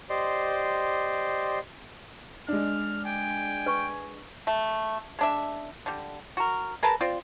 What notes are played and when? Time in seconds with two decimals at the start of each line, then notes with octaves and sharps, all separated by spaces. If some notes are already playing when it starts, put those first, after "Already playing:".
0.10 G4 C5 D5 D#5 C6
2.48 G#3 D4 F6
3.05 G5 G#5
3.66 B4 C#6
4.47 A3
5.19 G#3 D4 E5
5.86 D3 G3
6.37 F#4 A#4
6.83 G#4 A#4 B4 A5
7.01 C4 F4 D5